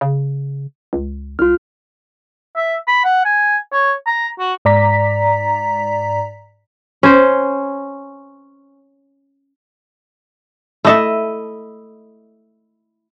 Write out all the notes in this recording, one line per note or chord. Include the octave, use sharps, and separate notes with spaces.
C#3
C#2
C2 F4 F6
E5
B5
F#5
G#5
C#5
A#5
F#4
G#2 D5 A#5 B6
C#4 C5
A3 E4 A4 D#5 E5